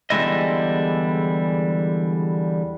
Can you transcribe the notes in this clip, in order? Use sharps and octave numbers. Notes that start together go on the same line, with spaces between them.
E2 D3 G3 G#3 E4 D#5